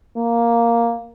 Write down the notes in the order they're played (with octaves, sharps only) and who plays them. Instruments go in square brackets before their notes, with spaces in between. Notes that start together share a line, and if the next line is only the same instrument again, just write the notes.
[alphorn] A#3